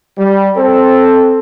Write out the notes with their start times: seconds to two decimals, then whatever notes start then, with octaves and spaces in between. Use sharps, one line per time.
0.18 G3
0.57 C4 A4